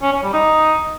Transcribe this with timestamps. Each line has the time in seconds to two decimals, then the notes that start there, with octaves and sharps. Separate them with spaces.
0.02 C#4
0.13 C#4
0.23 G3
0.33 D#4